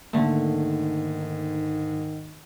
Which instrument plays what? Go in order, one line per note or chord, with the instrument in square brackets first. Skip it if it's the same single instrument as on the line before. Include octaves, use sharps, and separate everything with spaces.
[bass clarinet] G#2 [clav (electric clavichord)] D3 A3 [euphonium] D#3 [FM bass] A#3